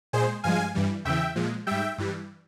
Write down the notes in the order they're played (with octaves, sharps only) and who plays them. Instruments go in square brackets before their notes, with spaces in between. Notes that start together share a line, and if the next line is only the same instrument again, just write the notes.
[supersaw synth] A#2 G#3 G#4 C5
G2 F3 G#3 F5 G#5
G2 E3 G3
E2 C#3 E3 E5 G5
A#2 F3 G#3
G#2 G3 E5 G5
G2 E3 G3